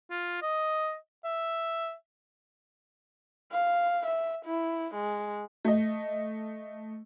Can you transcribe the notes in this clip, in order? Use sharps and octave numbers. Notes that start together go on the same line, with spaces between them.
F4
D#5
E5
F5
E5
E4
G#3
A3 D#5